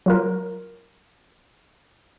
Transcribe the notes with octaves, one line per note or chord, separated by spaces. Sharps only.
F#3 F4 A#4